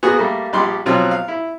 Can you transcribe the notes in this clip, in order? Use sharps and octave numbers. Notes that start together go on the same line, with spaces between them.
A#3 B3 F#4 G#4
G3 A3 A#3
A#1 G3 C6
B2 F3 F#3 C4 F4
F5
E4